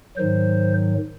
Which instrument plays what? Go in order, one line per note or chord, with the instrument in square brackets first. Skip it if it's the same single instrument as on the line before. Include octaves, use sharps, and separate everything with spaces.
[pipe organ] G#2 D#3 F#3 C5